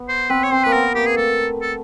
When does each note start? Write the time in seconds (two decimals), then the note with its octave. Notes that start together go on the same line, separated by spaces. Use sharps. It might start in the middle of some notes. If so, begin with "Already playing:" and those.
Already playing: B3
0.08 C5
0.30 C4 B4
0.43 C#5
0.52 C4 C5
0.63 A#3 B4
0.73 B3 A#4
0.95 A#3 G4
1.06 G#4
1.16 A3 A4
1.61 A4